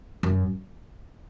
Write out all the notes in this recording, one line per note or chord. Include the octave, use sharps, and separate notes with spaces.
F#2